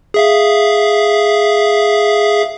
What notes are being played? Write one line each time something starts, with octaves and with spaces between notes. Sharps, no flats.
G#4 E5 F5